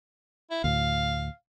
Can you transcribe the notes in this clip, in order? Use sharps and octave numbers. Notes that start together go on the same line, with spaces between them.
E4
D2 A2 F5